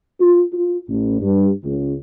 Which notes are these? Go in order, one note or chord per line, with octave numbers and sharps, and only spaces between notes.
F4
F4
A1
G2
C#2